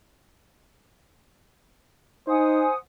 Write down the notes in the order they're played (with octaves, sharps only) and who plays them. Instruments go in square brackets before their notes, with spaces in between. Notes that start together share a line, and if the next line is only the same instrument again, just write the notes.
[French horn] D#4 [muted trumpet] C5 [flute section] F#5 G#5 D#6